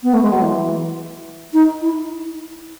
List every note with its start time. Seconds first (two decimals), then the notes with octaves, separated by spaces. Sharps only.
0.03 B3
0.14 A3
0.23 G#3
0.32 F#3
0.42 E3
1.53 D#4
1.82 E4